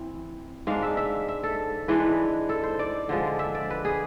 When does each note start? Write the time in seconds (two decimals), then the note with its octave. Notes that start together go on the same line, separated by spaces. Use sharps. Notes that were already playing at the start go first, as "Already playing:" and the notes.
Already playing: E3 C4
0.67 G#2 G#3 D4 F5
0.82 E5
0.97 E5
1.28 E5
1.43 A4
1.88 G#2 E3 G#3 D4 B4
2.49 A4
2.63 C5
2.79 D5
3.09 D3 F3 G#3
3.39 E5
3.55 D5
3.70 B4
3.85 G#4